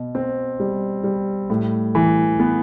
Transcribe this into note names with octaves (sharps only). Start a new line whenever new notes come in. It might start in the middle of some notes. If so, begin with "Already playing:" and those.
Already playing: B2
C4
G3
G3
A2
E3
B3